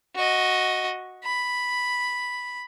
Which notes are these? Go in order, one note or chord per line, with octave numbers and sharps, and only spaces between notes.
F#4 D#5
B5